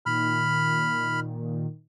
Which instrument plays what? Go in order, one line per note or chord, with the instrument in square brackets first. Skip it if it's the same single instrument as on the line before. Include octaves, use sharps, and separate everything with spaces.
[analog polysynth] A#2 D#3 [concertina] B5 F6